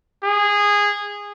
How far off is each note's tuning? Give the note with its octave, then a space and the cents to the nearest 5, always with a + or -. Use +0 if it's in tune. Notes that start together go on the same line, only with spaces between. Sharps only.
G#4 -15